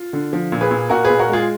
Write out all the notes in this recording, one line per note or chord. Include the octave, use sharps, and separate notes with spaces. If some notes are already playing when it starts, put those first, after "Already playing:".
Already playing: F4
D3
F3
A#2
G#4 B4
A#2
A#2 F#4 A#4
G#4 B4
A#2
F#4 A#4
G#3 F4 G#4